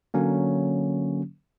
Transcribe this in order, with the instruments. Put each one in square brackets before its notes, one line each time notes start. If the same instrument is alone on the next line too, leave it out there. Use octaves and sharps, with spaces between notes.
[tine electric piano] D3 F#3 A#3 C#4